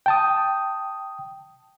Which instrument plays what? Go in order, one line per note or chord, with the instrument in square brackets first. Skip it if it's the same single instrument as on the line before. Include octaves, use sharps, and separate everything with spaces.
[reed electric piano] G5 A5 D#6